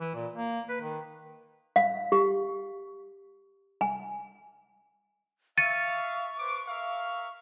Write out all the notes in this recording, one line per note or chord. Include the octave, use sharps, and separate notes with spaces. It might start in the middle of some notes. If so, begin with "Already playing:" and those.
E3
A#2
A#3
B4
D#3
F5
G4
G#5
E5 F5 C#6 A6 C#7 D#7
B4 C5 D6
A#4 E5 F5